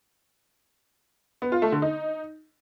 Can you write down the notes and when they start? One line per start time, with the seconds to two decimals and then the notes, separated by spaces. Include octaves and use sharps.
1.42 B3
1.52 F4
1.62 A3
1.72 D3
1.82 D#4